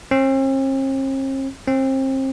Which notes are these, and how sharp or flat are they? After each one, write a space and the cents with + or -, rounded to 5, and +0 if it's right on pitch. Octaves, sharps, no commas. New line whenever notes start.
C4 +45
C4 +30